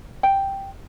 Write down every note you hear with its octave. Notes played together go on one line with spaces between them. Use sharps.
G5